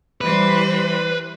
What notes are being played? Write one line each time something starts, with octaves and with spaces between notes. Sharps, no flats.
E3 G3 B4 C5